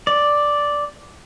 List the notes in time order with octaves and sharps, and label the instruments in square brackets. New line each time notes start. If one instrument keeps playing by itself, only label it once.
[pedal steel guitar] D5